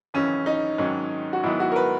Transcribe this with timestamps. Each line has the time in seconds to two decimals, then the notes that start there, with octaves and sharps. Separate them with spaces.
0.14 G#1 F#2 C#3 E3 C#4
0.46 D#4
0.78 G#1 G#2 D#3 F#3 C#4
1.33 F#4
1.43 G#2 D#3 F#3 B3 D#4 E4
1.60 F#4
1.72 A#4
1.76 B4